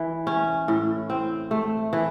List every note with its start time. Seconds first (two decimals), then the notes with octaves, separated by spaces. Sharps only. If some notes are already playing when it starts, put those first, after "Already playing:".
Already playing: E3
0.27 C#4
0.68 A2
1.10 C4
1.51 A3
1.93 E3